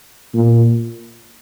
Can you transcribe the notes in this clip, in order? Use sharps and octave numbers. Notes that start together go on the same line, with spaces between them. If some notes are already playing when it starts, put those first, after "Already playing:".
A#2